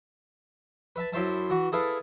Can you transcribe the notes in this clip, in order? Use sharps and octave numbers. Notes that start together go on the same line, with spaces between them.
B4 E5 A5
F#2 E4 C5 E5 A5
E3 F#4
E4 G#4 A4 B4 E5 F5